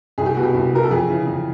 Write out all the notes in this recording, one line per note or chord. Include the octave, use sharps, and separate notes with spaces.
C2 G#4
G4
B2 F#4
G4
C2
B2 A#4
A4
F2 G#4
C#3 E3
F2